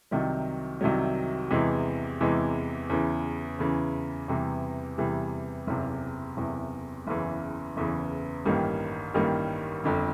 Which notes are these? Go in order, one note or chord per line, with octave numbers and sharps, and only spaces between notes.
C2 C3 D#3 F#3
C2 C3 D#3 F#3
E2 C3 E3 G#3
E2 C3 E3 G#3
E2 C#3 E3
E2 C#3 E3
E2 C3 E3 G3
E2 C3 E3 G3
F#1 E2 C3
F#1 E2 C3
F#1 E2 C#3 E3
F#1 E2 C#3 E3
A1 G2 D#3 G3 A#3
A1 G2 D#3 G3 A#3
G1 F2 D3